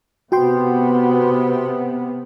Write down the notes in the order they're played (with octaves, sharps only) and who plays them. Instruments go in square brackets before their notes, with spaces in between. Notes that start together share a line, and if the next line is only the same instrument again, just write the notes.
[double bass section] C3 B3 [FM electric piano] F#4 G5 C6